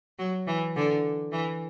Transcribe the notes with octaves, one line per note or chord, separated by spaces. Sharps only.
F#3
E3
D3
E3